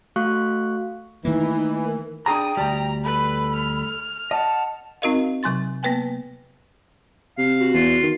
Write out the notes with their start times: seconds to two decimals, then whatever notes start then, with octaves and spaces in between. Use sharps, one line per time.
0.16 A3 F#4 F5 C#6 F#6
1.25 D#3 E3 A3 A#3 D#4
1.54 D#4
1.85 A#4
2.26 D4 G#4 G5 A#5 D#6
2.57 D2 G3 A#5
3.04 A4 B4 B5
3.54 F6
4.31 D#5 F#5 A5
5.02 C4 D#4 F#4 A#4 D#5 F5
5.43 C3 F#3 G#5 C6 A6
5.83 A#3 B3 B4 G5 G#5
7.38 C3 F5
7.60 F#4
7.74 E2 F4
8.03 D#3